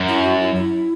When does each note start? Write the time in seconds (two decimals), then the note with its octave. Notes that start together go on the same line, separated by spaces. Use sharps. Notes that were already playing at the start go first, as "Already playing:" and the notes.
Already playing: F#2
0.08 E4
0.24 F#4
0.40 E4
0.55 E4